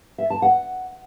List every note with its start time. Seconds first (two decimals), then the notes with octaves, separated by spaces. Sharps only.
0.18 E5
0.30 A5
0.42 F#5